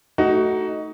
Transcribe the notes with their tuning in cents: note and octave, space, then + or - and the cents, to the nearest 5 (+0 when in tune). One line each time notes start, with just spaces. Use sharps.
A3 +0 D#4 +10 F#4 +15